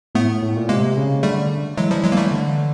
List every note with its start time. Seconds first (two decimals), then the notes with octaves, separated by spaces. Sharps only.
0.15 A2 A3 B3
0.42 A2
0.56 A#2
0.69 C3 G#3 A#3
0.97 C#3
1.23 D3 G3 A3
1.77 E3 F#3 G#3
1.91 F3 G3
2.04 F#3 G#3
2.12 A#3
2.17 G3 A3
2.31 D3